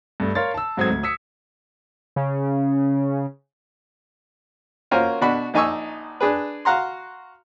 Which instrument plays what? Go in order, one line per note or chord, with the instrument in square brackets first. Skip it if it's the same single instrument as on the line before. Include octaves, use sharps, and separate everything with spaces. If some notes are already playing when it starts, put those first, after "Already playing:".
[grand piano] G2 A3
A#4 C#5 F5 C6 A6
A5 E6
G#2 F#3 C4 A4 D#6 G#6
D2
D#6 E6 B6 C#7
[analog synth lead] C#3
[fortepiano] A#3 C#4 F4 F#4 A#4 C5
B2 D4 F#4 B5
A#1 D#4 G#5 C#6 E6
D4 G#4 B4
F#4 F5 F#5 A#5 C6